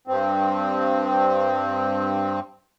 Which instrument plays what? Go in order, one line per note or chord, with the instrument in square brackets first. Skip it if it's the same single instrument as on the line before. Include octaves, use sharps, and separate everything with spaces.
[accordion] G2 C4